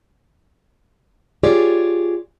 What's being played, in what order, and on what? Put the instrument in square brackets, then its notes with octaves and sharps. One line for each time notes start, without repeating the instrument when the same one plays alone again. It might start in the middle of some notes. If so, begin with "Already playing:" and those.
[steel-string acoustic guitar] F4 G4 G#4 C#5 D5